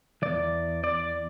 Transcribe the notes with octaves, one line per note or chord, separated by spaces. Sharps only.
E2 E3 D5
D5